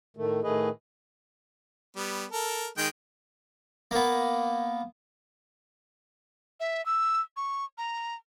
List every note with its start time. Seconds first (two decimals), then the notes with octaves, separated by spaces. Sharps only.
0.17 A2 D#3 A3
0.43 A2 D#3 A3 G#4 B4 D#5
1.96 G3 B3
2.32 A4 A#4
2.78 D#3 G#3 G5
3.91 A#3 B3
6.60 E5
6.86 E6
7.37 C#6
7.78 A#5